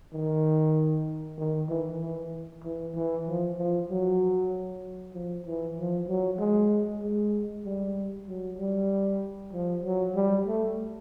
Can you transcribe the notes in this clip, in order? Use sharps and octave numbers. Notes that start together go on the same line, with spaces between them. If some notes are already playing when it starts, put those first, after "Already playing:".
D#3
D#3
E3
E3
E3
E3
F3
F3
F#3
F3
E3
F3
F#3
G#3
G#3
G3
F#3
G3
F3
F#3
G3
A3